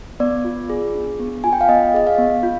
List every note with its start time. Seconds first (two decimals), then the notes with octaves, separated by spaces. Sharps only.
0.20 B3 D5
0.45 F4
0.70 G#4
0.94 D4
1.20 B3
1.44 F4 G#5
1.53 G5
1.61 F5
1.68 B3 D#5
1.94 G#4 D#5
2.07 F5
2.18 B3
2.43 F4